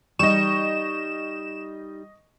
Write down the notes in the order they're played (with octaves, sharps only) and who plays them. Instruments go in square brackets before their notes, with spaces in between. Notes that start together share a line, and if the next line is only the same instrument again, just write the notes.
[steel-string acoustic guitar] G3 D#4 [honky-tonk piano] D#5 C#6 [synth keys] E7